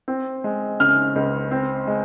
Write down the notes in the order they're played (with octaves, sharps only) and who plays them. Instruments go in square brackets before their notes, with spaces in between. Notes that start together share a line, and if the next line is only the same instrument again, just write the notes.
[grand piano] C4
G#3
C#3 F6
C#2
C4
G#3